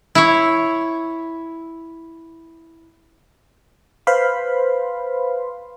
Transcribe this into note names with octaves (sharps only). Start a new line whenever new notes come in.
E4 C#5
B4 C5 F5 B5 C6